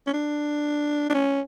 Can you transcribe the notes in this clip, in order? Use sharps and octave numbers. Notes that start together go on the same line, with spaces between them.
C#4
D4
D4
C#4